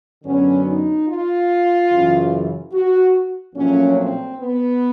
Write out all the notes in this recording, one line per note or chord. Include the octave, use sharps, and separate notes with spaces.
F#2 D3 F#3 B3 C#4
D#4
F4
F#2 C#3 E3
F#4
A#1 A#2 F#3 A3 C#4
C4
B3